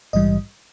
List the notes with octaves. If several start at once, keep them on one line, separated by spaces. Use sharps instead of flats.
A#1 G#2 E3 G3 D#5